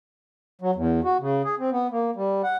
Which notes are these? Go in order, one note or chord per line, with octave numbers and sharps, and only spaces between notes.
F#3
E2
F#4
C#3
G#4
C4
B3
A#3
G3
F#5